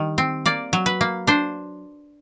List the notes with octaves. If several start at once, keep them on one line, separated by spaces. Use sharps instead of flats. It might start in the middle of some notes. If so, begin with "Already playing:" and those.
Already playing: D#3 G3
C4
A#3 D5
F#3
B4
A#3
D4 C5